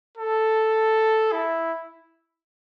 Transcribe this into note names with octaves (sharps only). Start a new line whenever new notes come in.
A4
E4